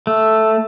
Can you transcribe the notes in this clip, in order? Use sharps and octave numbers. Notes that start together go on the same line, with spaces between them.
A3